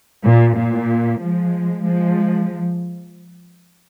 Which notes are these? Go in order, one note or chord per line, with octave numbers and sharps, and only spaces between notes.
A#2
A#2
F3 G#3
F3 G#3